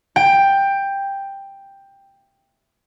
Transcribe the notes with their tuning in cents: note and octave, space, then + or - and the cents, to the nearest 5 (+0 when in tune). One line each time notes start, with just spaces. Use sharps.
G5 +10